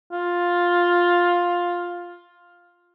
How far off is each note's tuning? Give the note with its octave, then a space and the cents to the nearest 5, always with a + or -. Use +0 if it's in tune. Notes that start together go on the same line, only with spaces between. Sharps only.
F4 +10